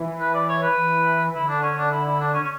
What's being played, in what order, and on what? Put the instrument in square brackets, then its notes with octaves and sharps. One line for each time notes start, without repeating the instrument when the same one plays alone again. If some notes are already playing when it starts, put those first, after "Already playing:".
Already playing: [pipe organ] E3
[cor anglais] B4
D5
C#5
B4
[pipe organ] E3
[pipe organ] D3 [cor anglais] E4
[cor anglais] D4
C#4
D4
E4
E4
D4
C#4
C#4